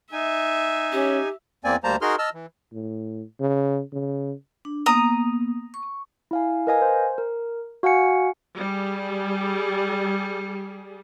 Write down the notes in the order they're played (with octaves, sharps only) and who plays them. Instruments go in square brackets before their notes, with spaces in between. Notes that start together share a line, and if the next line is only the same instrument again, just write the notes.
[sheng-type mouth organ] D#4 G#5 [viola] E5
[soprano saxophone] C#4 [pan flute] G4
[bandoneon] E2 A#3 C4 D5 G#5
D2 G3 A#3 C5 A5 A#5
D#4 F#4 G#4 A#4 C6 F6
D#5 A5 E6 F6
E3
[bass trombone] A2
C#3
C#3
[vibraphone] D4
[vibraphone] A#3 B3 [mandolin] A#5 D#6
[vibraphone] C#6
[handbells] E4 F5 G#5
A#4 B4 D#5 F5 G#5
C5
A#4
F#4 F5 F#5 G#5 C#7
[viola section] G3 G#4